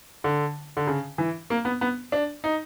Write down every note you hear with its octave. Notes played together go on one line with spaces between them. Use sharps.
D3
D3
C#3
E3
A#3
B3
B3
D4
D#4